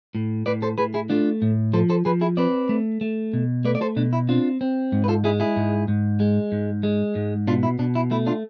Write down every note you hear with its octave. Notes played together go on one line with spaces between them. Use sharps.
A2
A2 B4 D5
A4 C5
A2 G#4 B4
E4 G#4
A3 D4 F4
A2
F3 A4 C5
A4 C5
F3 G#4 B4
E4 G#4
C4 B4 D5
A3
A3
B2
A3 B4 D5
D5
A4 C5
B2 D4
E4
C4 D4 F4
C4
G#2
B4
F4 A4
G#3 E4 G#4
E4 G#4
G#2
G#2
G#3
G#2
G#3
G#2
B2 D4 F4
E4
B2 D4
E4
A3 E4
D4 F4